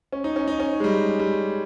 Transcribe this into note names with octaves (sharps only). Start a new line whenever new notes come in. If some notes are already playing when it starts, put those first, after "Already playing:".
C#4
D#4
C#4
D#4
C#4
G#3
G3
G3